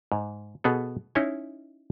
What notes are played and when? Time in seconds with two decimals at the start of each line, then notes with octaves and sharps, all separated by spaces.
0.12 G#2
0.64 B2 B3 G#4 A4
1.15 C#4 D#4 E4 C#5 D#5 G#5